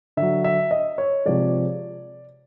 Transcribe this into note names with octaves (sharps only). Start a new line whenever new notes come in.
D3 F#3 E5
E5
D#5
C#5
C3 F3 G#3 D5